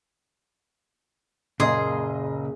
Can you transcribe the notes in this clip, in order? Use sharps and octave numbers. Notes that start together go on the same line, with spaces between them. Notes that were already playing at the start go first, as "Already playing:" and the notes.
F#1 A#2 C#3 A#3 G#4 D#5 C6 D#6